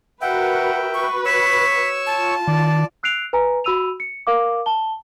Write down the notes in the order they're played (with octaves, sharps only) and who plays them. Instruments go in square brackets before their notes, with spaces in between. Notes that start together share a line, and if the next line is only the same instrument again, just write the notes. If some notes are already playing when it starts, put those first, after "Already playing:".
[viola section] F#4 A#4 B4 [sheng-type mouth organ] E5 G5 [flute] F#5
[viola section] F#4 B4 [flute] C#6
[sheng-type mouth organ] C#5 C#6 E6 [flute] B6
[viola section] F4 [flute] A5
[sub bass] D#3 [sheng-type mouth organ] D5
[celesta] E6 F#6 C7 D7 F7
B4 G#5 A#5
F#4 B5 E6 D#7 F7
C#7
A#4 F5 D6
A5 G7